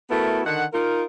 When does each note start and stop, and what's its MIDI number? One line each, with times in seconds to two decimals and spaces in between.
0.10 0.41 57
0.10 0.41 59
0.10 0.41 64
0.10 0.41 66
0.10 0.41 70
0.46 0.64 50
0.46 0.64 51
0.46 0.64 78
0.73 1.03 63
0.73 1.03 65
0.73 1.03 70